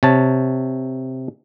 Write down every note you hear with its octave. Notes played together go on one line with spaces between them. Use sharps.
C3 C#5 A5